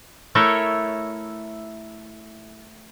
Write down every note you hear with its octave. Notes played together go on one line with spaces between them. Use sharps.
A3 E4 A4 A#4 C#5